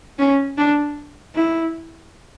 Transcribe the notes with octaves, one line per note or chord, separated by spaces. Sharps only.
C#4
D4
E4